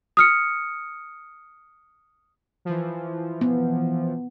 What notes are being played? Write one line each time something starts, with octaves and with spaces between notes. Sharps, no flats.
D#6 F6 C#7
E3 F3
B3